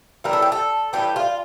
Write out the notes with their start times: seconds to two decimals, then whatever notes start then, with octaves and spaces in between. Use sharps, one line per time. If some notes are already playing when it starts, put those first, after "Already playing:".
0.24 A2 E3 G3 D4 A#4
0.33 A4
0.42 G4
0.52 A4
0.93 A2 E3 G3 D4 G4
1.16 F4